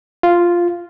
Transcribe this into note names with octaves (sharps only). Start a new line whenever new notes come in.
F4